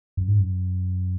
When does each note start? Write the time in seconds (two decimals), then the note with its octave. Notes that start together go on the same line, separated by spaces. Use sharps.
0.17 F#2
0.28 G#2
0.40 F#2